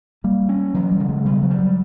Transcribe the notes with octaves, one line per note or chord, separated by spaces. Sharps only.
G3 A#3
C#4
E3 F#3
G3
C#3
G#3
B2 G3
F#3
G3
F#3